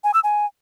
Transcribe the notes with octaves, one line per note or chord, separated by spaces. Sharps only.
G#5
E6
G#5